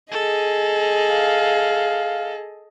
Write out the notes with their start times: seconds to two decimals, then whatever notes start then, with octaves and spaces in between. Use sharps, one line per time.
0.12 G#4 A4 D#5
1.11 F5